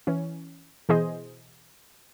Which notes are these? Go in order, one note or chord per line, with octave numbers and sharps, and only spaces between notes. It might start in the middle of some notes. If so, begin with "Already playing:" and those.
E3 C#4
B2 E3 G#4 C5 D#5